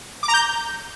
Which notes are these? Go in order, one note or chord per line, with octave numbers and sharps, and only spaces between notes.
D6
A#5
G6